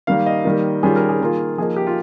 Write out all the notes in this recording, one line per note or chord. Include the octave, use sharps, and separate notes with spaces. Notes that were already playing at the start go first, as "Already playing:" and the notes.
D#3 G3 A#3 F5
D#5
D#3 G3 A#3
D#3 G3 C#4 F4 G#4
A#4
G#4
D#3 A#3 F4
F3 A#3 D#4 G#4
G4
F4